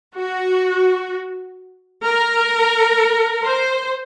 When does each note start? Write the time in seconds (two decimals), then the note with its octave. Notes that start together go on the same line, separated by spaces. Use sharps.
0.16 F#4
2.03 A#4
3.44 C5